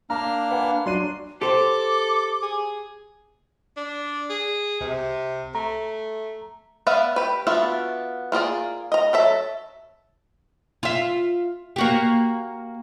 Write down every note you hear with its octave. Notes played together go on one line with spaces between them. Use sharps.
A#3 D4 A#5 F6
B4 F#5 G#5
F#3 D4 C6 D#7
G4 A4 C5 D6
G#4
D4
G#4
C2 C3
A3 A#5
B3 B4 D5 E5 F5
G4 B4
B3 D4 F4 F#4 E5
A#3 F4 G#4 D5
D#5 A#5
F#3 A4 E5
F4 E5
A#3 F#4 G4